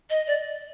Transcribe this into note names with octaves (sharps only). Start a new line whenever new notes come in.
D#5
D5